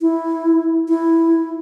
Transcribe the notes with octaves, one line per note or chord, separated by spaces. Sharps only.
E4
E4